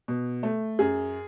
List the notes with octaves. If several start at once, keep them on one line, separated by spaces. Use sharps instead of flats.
B2
A3
F#2 G#4